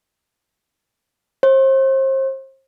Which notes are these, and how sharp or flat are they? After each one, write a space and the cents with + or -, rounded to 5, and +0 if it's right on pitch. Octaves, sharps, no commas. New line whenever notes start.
C5 +35